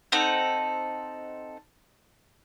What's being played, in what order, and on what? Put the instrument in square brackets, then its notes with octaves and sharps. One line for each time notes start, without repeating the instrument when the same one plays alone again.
[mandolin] C4 D#4 A4 F#5